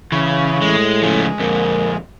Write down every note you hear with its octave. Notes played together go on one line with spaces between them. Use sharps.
C#3 E3 C#4
A2 G#3
C#3 F3 G#3
F2 A#2 A#4